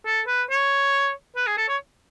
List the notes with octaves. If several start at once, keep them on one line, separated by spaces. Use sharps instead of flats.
A4
B4
C#5
B4
G#4
A4
C#5